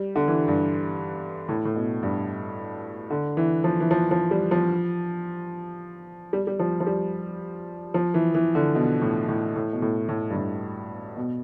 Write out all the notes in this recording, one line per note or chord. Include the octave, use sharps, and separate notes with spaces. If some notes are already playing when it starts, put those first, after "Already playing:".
Already playing: G3
D3
E3
G2
A2
A2
B2
G2
D3
E3
F3
E3
F3
F3
G3
F3
G3
G3
F3
F3
G3
F3
E3
E3
D3
B2
A2
A2
A2
B2
A2
A2
G2
A2
B2